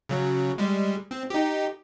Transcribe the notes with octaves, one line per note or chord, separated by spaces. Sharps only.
C#3 F#3
G3 G#3
C4
D#4 G4